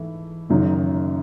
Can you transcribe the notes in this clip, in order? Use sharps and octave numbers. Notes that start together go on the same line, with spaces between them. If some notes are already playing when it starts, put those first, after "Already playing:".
Already playing: G#2 E3 A3 E4
F#1 F#2 D#3 F#3